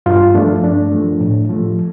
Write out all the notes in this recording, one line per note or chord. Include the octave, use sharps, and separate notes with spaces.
G2 F4
F3 A3 D4
G2 D4
F3 A3
A2
F3 A3